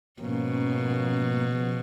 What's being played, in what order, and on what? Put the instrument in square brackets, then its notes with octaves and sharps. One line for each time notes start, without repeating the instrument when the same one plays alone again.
[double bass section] G#2 F3 A#3 C#4 [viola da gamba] B2
[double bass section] C#3 F3 B3